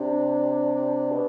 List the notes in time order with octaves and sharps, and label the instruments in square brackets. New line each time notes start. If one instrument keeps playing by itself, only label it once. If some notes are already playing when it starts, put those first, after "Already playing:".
Already playing: [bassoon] C3 [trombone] D4
[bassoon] B2